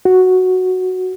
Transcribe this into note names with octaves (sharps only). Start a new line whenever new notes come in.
F#4